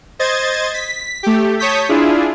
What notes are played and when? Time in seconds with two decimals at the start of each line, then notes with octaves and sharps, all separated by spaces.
0.19 C5 D#5 G#6 A6
0.74 B6
1.23 A3 G4
1.59 C#5 A5 C#6 D#6 G6 B6
1.89 D4 E4 F4 G#4